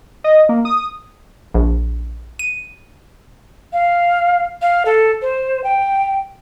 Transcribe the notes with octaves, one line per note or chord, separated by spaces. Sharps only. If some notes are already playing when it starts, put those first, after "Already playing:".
D#5
A#3
D#6
A#1
D#7
F5
F5
A4
C5
G5